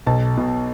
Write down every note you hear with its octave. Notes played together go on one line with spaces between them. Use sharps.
B1 A5
B2